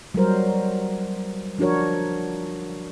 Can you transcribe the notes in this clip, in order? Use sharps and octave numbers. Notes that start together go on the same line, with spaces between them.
F#3 G3 A#4 C5
F3 D4 F#4 A#4 C#5